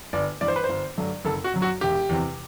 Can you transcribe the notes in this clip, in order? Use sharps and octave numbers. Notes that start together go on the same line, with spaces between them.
G1 D5
G2 E3 D5
C5
B4
G1 C5
G2 D3 F#3 A3
F#1 A4
F#4
F#2 F#3
F#4
E1 G4
E2 C3